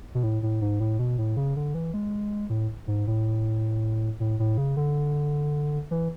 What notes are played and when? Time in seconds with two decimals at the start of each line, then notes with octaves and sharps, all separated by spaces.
0.15 B2
0.23 A2
0.43 A2
0.61 G#2
0.80 A2
0.99 B2
1.18 A2
1.37 C#3
1.56 D3
1.74 E3
1.94 G#3
2.50 A2
2.87 G#2
3.07 A2
4.20 A2
4.39 A2
4.57 C#3
4.77 D3
5.91 E3